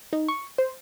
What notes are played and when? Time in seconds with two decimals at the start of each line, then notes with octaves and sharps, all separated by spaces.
0.13 D#4
0.28 C#6
0.58 C5